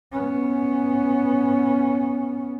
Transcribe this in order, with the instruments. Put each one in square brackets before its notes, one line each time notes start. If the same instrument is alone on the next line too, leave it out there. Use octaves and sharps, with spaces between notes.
[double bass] B3 C#4